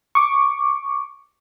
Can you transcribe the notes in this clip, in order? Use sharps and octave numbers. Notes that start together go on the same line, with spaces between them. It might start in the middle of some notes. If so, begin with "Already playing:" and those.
C#6 D6